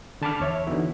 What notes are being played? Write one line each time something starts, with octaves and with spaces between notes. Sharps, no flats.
D3 A5 B5 D6 F6
E2 C#5 E5
D3 E3 B3 D#4 E4 F#4